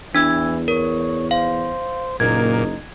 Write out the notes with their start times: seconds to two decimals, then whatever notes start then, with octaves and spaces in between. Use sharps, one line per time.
0.15 E2 E3 D4 E6 G#6
0.68 A#4 C#5
1.31 C5 F5
2.20 F#1 A#2 D#4 G#6